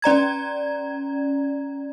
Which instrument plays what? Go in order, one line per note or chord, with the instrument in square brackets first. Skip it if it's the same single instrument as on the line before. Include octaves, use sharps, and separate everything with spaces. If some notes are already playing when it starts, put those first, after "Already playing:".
[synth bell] C#4 D5 A#5 G#6